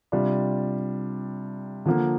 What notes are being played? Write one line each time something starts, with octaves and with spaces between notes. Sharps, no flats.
C3 G3 D4 F4
D3 F3 A#3